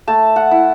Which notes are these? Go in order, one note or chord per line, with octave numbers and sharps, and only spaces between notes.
A3 A5
F#5
E4